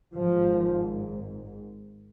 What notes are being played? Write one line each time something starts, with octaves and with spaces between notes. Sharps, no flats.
G#1 G#2 F3